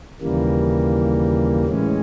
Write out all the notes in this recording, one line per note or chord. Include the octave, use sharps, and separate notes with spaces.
D#2 C#3 E3 G3 A#3
A2 E3 G#3 C#4